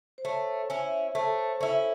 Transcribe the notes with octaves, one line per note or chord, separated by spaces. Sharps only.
C5
A3 C#5
C#4 E4
A3 C5
A4
C5
C#4 E4